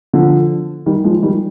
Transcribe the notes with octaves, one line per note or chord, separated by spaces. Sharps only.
D3 F3
D#3 G3
F3 G#3
D#3 G3